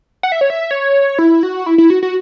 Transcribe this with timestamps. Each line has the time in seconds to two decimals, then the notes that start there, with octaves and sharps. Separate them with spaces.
0.23 F#5
0.32 E5
0.41 C#5
0.50 E5
0.71 C#5
1.19 E4
1.43 F#4
1.66 E4
1.78 E4
1.90 F#4
2.03 F#4